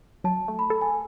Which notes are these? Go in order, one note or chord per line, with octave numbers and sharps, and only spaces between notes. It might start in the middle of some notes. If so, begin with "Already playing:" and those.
F#3 A5
A3
B5
A4
G#5